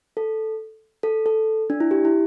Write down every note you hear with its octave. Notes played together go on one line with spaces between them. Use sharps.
A4
A4
A4
D4
E4
G4
E4